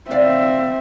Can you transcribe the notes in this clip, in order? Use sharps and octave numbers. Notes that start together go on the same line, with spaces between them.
C3 C4 D5 E5 F5